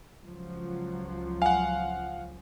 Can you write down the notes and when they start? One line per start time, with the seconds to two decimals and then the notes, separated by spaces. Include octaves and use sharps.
0.21 C#2 F3 F#3
1.42 F5 F#5 G#5